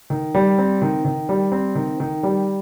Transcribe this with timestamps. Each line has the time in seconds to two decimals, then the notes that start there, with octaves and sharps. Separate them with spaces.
0.10 D#3
0.35 G3
0.58 C4
0.82 D#3
1.05 D#3
1.29 G3
1.52 C4
1.75 D#3
2.00 D#3
2.23 G3